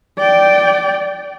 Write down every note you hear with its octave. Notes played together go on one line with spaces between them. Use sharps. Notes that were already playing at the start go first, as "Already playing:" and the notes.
D5 G5